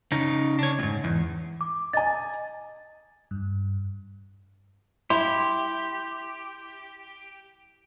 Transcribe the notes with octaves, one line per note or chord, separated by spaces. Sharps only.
C#3 D#4
D4 C#5
C#2 G#2
E2
D6
D#5 G#5 A6
G2
E4 G4 C6